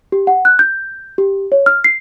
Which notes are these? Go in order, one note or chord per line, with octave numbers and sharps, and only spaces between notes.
G4
F#5
F#6
G6
G4
C#5
F6
C7